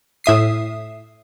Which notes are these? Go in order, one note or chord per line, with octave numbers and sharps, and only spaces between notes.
A2 E5 D#6 C7